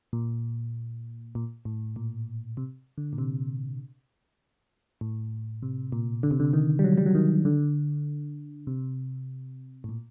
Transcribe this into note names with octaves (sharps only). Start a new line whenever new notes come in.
A#2
A#2
A2
A#2
C3
D3
A#2
C3
A2
C3
A#2
D3
C3
D3
D#3
G3
F#3
G3
F#3
D#3
D3
C3
A2
A#2